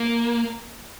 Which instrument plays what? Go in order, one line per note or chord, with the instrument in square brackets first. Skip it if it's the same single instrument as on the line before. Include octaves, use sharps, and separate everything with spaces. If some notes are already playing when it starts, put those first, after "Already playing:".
Already playing: [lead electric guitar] A#3